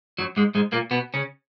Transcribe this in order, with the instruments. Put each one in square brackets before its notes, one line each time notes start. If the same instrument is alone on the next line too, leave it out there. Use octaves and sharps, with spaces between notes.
[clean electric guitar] F#2 F#3
G#2 G#3
G#2 G#3
A#2 A#3
B2 B3
C#3 C#4